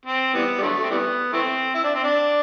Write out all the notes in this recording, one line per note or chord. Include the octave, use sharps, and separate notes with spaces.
C4
E3 G3 B3
G3
D3 F#3 A3
C4
E3 G3 B3
E3 A3 C4
E4
D4
C4
D4